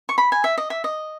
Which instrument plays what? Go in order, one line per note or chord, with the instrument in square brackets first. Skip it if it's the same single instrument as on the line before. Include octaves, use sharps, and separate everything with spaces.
[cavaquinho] C#6
B5
G#5
E5
D#5
E5
D#5